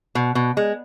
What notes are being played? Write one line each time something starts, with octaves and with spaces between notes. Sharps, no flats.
B2
B2
G#3